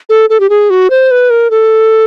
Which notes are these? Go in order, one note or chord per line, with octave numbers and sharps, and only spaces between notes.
A4
A4
G4
G#4
F#4
C5
B4
A#4
A4